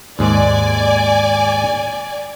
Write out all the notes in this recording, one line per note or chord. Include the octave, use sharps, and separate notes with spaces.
D#2 G#2 G#3 D5 G#5